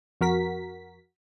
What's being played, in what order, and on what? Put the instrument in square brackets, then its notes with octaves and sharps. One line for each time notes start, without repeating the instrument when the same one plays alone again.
[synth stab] F2 F#4 A#4 B6